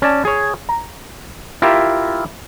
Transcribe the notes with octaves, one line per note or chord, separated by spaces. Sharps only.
C#4 D5 A5
G#4 C#5
A#5
E4 F4 G4 A#4 E5